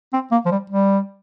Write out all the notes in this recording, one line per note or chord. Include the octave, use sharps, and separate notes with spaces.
C4
A#3
F3
G3
G3